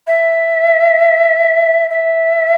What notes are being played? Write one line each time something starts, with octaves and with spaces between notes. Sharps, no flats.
E5
E5